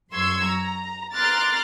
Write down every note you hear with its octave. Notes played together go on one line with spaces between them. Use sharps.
F#2 F#3 C6 C#6 E6 G#6
A#5
A#5 C6 D6 F6 F#6 A6